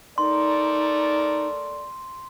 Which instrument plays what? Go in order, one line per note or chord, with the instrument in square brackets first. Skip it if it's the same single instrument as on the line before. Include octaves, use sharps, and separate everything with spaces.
[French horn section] A3 A#4 D5 [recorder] D#4 [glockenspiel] C6